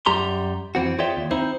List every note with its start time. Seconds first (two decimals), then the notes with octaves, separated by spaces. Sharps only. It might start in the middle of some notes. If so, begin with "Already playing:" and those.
0.06 F#2 G3 G4 A#5 C6
0.75 F2 E3 C4 F#4
0.99 F4 G#4 C#5 D5 E5 G5
1.17 D#2
1.31 C4 D#4 E4 C5